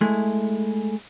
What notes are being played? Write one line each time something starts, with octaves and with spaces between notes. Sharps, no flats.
G#3 A3 E4